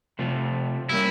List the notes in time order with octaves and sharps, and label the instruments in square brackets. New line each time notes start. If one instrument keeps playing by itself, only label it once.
[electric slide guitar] C3 F3 A3
[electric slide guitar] G3 A#3 C#4 [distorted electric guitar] E4